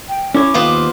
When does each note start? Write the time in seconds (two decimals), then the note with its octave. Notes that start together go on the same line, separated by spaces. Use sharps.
0.09 G5
0.34 C#4 E4 C#5 D6
0.54 D#2 B3 F4 C5